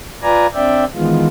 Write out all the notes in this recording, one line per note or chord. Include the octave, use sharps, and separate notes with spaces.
F4 B4 D5 G#5 A#5
C4 D4 D5 E5 G5
D#3 E3 G#3 B3 F4